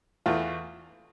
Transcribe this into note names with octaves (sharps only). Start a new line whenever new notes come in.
E2 E3 A3 F4